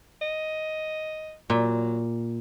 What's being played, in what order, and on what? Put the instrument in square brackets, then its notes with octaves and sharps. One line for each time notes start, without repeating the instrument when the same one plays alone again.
[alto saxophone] D#5
[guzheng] A#2 [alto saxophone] F#3